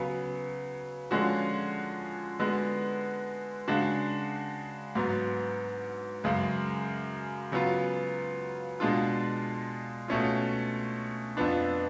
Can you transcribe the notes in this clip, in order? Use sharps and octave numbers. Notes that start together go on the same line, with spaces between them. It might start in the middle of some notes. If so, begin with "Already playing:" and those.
Already playing: C#3 F#3 B3
D3 F3 G#3 C#4 F#4
D3 G#3 B3 F#4
C#3 G#3 D4 F#4
G#2 F#3 B3
F#2 C#3 G#3
C#3 F#3 B3 F4
B2 G#3 D4 F4
B2 A3 C#4 F4
F2 F3 B3 D4